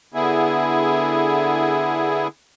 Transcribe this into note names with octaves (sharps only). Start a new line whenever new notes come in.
D3 B3 E4 G#4